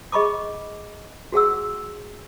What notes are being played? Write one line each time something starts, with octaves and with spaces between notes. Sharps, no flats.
G#4 D#5 B5 C#6 D6
F#4 G#4 F#5 E6